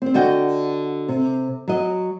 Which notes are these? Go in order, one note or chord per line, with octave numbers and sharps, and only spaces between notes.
C4 C5
D3 F#4 D#5 G5
C3
F#3 D#5